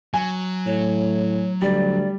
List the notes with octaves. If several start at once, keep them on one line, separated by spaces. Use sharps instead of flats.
F#3 G#5
A2 C#5
D2 G3 D5